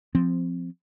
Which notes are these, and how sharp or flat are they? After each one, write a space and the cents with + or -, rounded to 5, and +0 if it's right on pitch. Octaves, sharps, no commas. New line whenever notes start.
F3 +0 C4 -10